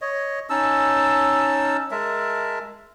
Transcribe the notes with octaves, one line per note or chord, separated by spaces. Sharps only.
C#5 D#5
C#4 D#4 A5 E6
G#3 A#4 E5 A5